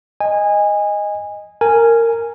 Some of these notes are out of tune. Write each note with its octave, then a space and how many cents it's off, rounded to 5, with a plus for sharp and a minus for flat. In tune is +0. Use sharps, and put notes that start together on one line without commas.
D#5 +0 G#5 -20
A#4 -15 G#5 +0